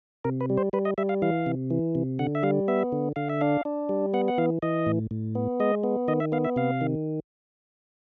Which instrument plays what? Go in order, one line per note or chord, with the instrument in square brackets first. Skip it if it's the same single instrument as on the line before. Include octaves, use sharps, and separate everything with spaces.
[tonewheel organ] C3 A#4
B4
G3
C5
G3 B4
D#5
G3 E5
F5
E3 F5
C3
E3
C3
D3 F#5
E5
G3 F5
B3 E5
D3
D3 F5
E5
D4 F5
D4
G3
B3 F#5
F#5
E3 F5
E3 D#5
A2
A2
B3
G#3 D#5
B3
D#3 D#5
E5
B3 F5
E5
C3 F5
D#3